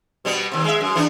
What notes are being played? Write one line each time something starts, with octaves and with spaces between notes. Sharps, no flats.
B2 G3 B3
D#2 C3
G#3 E5
F#2
E3 B3 D4